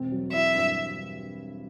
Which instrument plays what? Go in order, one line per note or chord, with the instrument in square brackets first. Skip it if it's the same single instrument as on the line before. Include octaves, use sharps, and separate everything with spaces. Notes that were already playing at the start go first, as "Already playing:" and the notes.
Already playing: [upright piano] E1 C4
F#3
[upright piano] E4 [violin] E5
[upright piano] G2